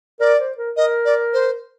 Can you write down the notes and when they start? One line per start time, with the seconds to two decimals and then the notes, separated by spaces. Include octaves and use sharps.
0.20 A#4 D5
0.39 C5
0.57 A#4
0.77 A#4 D#5
1.05 D5
1.33 C5